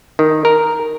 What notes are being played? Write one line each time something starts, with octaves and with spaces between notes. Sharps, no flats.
D#3
A#4